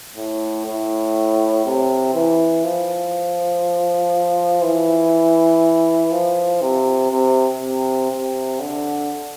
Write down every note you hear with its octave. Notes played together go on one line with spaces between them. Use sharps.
A2
A2
C3
E3
F3
E3
F3
C3
C3
C3
C3
D3